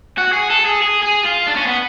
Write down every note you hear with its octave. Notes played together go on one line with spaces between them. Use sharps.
F#4
G#4
A4
G#4
G#4
G#4
F4
D4
C#4
B3